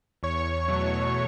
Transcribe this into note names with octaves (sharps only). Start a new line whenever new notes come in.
E2 C#5 C#6
B2 F#3 A3